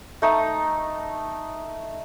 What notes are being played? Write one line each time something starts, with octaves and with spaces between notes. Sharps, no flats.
A3 D#4